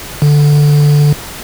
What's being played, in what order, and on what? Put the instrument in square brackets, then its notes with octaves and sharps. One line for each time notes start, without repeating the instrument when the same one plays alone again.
[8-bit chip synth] D3